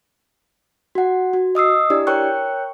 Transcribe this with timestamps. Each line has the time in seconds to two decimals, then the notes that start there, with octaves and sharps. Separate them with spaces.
0.95 F#4 F#5
1.33 F#4
1.55 D#5 D#6 E6 C7
1.90 D4 E4 G4 D5
2.07 A#4 C#5 G5 C#6 F#6